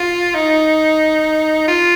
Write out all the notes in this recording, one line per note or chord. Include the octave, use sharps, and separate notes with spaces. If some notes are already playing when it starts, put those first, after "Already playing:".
Already playing: F4
D#4
F4